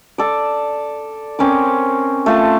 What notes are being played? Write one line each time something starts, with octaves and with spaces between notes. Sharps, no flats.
A4 D5
C4 C#4 A#4 D6
A3 F4 A5